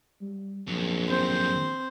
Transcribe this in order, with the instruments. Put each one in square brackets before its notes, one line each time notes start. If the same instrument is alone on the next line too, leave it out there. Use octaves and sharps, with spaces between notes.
[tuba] G3
[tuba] A#1 [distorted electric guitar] F2 F#3
[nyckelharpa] C4 C5